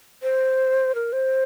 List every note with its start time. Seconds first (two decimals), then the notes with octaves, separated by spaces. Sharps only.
0.23 C5
0.95 A#4
1.13 C5